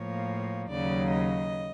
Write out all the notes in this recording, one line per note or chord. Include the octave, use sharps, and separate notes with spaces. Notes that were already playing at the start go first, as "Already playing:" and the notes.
Already playing: A2 F3 A#3 C#5
D#2 C#3 F#3 D5
D#5